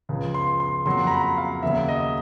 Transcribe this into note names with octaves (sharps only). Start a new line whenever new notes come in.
C#2 C#3 F3
C6
C6
F2 C#3 F#3 A#3 C6
A#5
B5
F5
D#2 C#3 F#3 E5
D#5